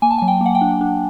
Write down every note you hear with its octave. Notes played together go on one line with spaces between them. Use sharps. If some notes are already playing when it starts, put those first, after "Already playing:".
A#3 G#5
A5
G#5
F#3
G5
A#3 F#5
G5
D4
D4